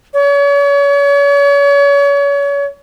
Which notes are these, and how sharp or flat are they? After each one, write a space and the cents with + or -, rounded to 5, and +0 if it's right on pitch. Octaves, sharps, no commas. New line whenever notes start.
C#5 +35